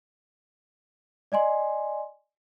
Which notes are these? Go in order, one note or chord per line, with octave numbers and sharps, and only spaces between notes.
D5 D#5 G#5 C6